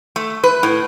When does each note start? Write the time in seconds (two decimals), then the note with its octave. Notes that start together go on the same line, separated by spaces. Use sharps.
0.16 A3
0.44 B4
0.63 A2